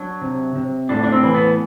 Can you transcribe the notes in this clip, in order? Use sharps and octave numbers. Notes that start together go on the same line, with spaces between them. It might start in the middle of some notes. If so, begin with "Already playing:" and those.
Already playing: F#3 D4
C3
C3
A2 D4
D4
C4
E3
B3